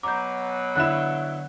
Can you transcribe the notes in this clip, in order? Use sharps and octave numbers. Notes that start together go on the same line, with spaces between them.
B2 F#3 A#5 D6 G6
D3 E4 F#6 E7